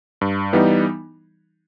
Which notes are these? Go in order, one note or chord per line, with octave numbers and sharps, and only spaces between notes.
G2
E3 G3 B3 D#4